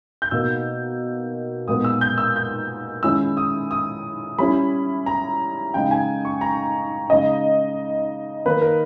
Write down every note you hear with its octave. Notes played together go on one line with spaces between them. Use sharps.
G6
B2 A#3 D#4 E6
A#2 G#3 B3 D#4 D#6
E6
G6
E6
G6
D#3 G#3 C#4 E4 E6
D#6
D#6
G3 C#4 E4 B5
A#5
C#3 G#3 D#4 G5
G#5
C#6
A#5
C#3 G#3 D#4 D#5
D#3 A#3 D#4 B4
A#4